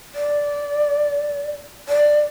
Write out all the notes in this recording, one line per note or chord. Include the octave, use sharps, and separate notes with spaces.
D5
D5